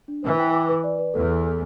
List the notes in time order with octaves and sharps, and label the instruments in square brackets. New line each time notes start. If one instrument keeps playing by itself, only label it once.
[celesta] D4
[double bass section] E3 [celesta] C5
[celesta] G5
D6
B4
D5
B4
[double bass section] E2 [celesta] A4
[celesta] A4
A4